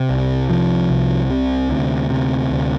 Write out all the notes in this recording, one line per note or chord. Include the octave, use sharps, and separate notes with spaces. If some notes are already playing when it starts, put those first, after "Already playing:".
Already playing: C3
C2
C3 F3
C2
C3
D2
C3
D2